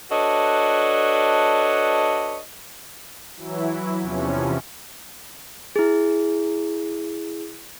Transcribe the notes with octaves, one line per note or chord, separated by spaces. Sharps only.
D4 F#4 A4 B4 C#5 D#5
E3 F#3 E4
E2 C3 E3 F3 C#4
E4 G#4